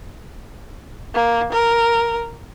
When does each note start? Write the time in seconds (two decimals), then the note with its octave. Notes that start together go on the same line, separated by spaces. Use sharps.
1.14 A#3
1.52 A#4